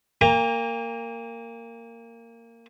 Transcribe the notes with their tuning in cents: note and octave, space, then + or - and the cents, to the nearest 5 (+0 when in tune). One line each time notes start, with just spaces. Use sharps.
A#3 -15 G5 +45 A#5 +0